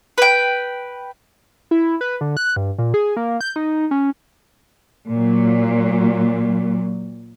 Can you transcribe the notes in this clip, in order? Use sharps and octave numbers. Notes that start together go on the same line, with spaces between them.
B4 G5
E4
B4
D3
F#6
G2
A#2
G#4
A#3
G6
D#4
C#4
A#2 F#3